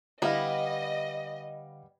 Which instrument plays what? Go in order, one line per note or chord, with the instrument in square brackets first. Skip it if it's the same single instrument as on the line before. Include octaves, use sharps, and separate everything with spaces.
[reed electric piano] D3 F5 [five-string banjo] G3 B3 E4 [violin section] D#5